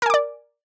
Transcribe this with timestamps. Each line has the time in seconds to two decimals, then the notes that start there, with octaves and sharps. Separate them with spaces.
0.02 A#4
0.06 G#5
0.10 D6
0.14 D5